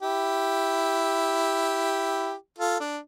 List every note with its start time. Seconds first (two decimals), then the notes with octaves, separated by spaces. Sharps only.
0.02 E4 G4
2.59 F4 A4
2.80 D4